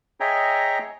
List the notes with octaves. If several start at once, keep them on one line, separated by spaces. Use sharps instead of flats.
G#4 C#5 D#5 E5 G5 A#5